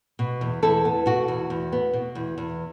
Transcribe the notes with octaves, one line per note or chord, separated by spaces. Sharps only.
B2
E2
E2 E4 A4
B3
B2 F#4
E2
E2
B3
B2
E2
E2